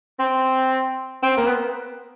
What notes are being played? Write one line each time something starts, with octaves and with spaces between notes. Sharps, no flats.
C4
C4
A#3
B3